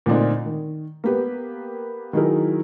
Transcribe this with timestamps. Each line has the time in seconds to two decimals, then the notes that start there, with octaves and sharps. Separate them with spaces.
0.06 A#2 D3 A3 C4 D4 D#4
0.46 D#3
1.04 A#3 B3 G4 B4
2.13 D#3 F#3 D#4 E4 G#4 A#4